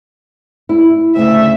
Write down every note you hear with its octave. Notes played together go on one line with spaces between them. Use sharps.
E4
D2 C#3 E5